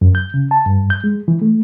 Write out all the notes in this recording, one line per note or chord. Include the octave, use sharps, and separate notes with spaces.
F#2
G6
C#3
A5
G2
G6
G#3
E3
A3